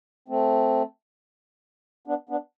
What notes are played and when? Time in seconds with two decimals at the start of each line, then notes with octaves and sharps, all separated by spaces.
0.28 A3 C4
2.07 B3 D4
2.29 B3 D4